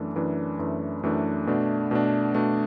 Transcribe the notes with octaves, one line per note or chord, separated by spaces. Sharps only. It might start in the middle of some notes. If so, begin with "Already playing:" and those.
Already playing: F#2 E3 A3 D4
F#2 E3 A3 D4
F#2 E3 A3 D4
F#2 E3 A3 D4
B2 A3 D4
B2 A3 D4
B2 A3 D4